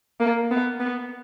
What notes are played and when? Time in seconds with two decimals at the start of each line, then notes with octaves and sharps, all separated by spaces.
0.20 A#3
0.51 B3
0.80 B3